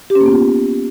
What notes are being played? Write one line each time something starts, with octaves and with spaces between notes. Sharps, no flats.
G4
C#4
A#3
B3
F4